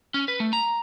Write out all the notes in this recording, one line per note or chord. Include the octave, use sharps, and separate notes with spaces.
C#4
B4
A3
A#5